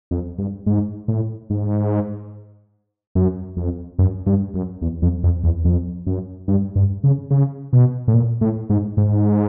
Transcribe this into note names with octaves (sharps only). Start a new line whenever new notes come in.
F2
G2
G#2
A2
G#2
F#2
F2
F#2
G2
F#2
E2
F2
F2
E2
F2
F#2
G2
G2
C#3
C#3
B2
A2
A#2
A2
G#2
G#2